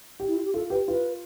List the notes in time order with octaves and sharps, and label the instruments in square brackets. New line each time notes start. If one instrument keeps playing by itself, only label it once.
[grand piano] G4
[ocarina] E4
F4
G4
[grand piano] F4 [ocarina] A4
[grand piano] G4 [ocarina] B4
[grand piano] F4 [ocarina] B4